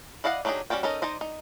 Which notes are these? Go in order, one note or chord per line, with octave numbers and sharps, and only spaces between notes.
E4 D5 D#5 F5 F#5
F#3 D4 D#4 G4 G#4
G3 C#4 F#4 D5 G5
C#4 D#4 A4 A#4 D#5
D#4 C5 D5 D#5
D#4